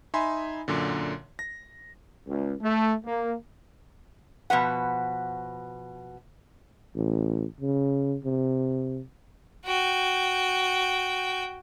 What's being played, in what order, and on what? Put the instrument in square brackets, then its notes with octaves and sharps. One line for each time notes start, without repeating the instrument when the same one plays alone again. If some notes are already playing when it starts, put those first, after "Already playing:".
[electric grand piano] D#4 E5 G#5 B5 C6
F#2 A#2 D3
A#6
[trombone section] C#2
A3
A#3
[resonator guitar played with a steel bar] B2 F3 B4 F#5
[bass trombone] A1
C#3
C3
[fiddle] F#4 G5